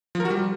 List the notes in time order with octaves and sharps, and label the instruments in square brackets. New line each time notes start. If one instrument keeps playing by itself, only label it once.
[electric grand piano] F3
A#4
F#4
G3